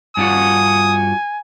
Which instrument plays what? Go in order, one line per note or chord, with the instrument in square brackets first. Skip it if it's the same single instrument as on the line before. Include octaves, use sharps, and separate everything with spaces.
[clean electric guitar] G2 F4 F#4 [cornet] G#5 [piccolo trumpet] D#6